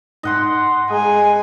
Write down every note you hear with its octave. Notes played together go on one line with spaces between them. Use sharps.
G#2 D#4 D#5 F#5 C6
G#3 G#5 A#5 D#6